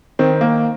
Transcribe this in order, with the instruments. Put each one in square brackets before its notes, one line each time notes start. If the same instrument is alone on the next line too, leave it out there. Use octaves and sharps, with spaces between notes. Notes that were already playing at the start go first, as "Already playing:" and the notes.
[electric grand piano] D#3 [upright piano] C4
[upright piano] A#3